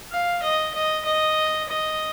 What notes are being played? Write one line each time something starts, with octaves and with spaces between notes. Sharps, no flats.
F5
D#5
D#5
D#5
D#5